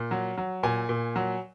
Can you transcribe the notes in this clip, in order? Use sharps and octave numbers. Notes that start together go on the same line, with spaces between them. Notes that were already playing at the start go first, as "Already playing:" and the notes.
Already playing: A#2
F#3
F#3
A#2 G#5
A#2
F#3